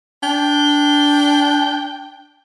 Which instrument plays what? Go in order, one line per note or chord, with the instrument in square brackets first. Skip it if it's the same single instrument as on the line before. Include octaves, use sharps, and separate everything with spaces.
[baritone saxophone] D4 [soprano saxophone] G5